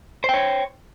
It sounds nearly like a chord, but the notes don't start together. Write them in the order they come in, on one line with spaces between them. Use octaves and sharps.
C5 G5 C#5